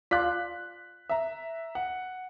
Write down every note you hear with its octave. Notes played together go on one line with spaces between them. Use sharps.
F4 D5 F#6 B6
E5 A#5
F#5